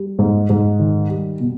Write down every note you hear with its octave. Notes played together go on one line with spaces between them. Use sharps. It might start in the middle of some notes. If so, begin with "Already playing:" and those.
Already playing: G3
G#2
G#2
D#3
G3
B2